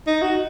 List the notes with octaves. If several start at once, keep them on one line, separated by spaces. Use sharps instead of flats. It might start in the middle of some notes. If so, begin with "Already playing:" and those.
D#4
F#4